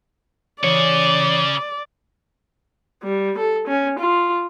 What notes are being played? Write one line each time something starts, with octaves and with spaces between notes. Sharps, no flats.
C#3 E3 G#4 C#5 D5 C#7
G3
A4
C#4
F4